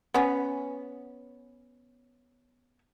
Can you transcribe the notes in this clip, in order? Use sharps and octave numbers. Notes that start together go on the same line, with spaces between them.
B3 C#4